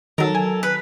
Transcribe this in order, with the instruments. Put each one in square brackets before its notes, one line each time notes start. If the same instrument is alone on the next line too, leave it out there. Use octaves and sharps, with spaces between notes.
[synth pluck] D#3 F#3 [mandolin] A4 A#4
[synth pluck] G#5
[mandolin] B4